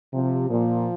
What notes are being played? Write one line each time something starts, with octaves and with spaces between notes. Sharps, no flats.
C3 F3
A#2 F3